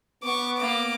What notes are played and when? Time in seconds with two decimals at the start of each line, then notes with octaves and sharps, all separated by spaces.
0.23 B3 C#6 D6
0.57 A#3 D6